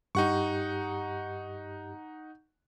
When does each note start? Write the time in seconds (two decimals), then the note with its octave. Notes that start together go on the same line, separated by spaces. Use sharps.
0.15 G2 D#4 G4 F#5 C#6